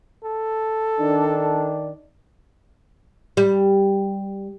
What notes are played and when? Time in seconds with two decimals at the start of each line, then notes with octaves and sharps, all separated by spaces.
0.24 A4
1.00 D#3 D4
3.37 G3